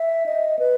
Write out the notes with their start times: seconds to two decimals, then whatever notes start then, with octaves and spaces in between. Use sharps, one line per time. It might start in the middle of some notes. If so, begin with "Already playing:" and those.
Already playing: E5
0.26 D#5
0.59 B4